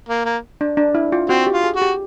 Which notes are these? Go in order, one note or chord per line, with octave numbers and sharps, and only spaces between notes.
A#3
A#3
D4
D4
E4
F4
C4 F#4
G4
F4
G#4
F#4
G4